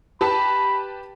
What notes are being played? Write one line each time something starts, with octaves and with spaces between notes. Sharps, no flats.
G4 B4 A5 B5